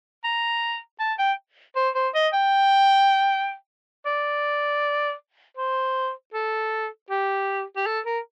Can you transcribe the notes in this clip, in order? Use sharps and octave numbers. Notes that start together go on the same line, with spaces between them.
A#5
A5
G5
C5
C5
D#5
G5
D5
C5
A4
G4
G4
A4
A#4